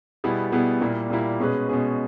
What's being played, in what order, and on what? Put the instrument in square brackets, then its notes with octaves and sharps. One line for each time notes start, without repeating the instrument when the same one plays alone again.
[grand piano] B2 G3 B3 E4 G#4
B2 G3 B3 E4 G#4
A#2 G3 A#3 E4
A#2 G3 A#3 E4
B2 G#3 C#4 G#4 B4
B2 G#3 C#4 G#4 B4